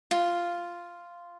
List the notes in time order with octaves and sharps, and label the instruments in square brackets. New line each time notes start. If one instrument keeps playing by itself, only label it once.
[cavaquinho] F4